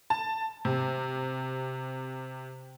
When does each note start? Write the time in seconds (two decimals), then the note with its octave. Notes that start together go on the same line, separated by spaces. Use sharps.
0.10 A5
0.65 C3